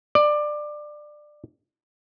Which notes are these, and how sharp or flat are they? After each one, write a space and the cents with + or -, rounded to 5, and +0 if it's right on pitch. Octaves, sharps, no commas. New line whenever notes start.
D5 +20